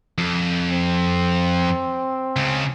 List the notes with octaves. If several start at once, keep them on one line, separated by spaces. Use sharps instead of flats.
F2
C4
C#2 C#3